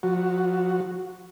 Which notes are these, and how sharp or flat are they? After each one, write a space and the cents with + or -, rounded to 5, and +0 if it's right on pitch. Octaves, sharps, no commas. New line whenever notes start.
F3 +30 F#4 +0